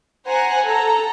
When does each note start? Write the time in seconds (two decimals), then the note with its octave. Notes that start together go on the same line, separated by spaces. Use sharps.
0.26 C5 F#5 G#5 A#5
0.64 A4 A#5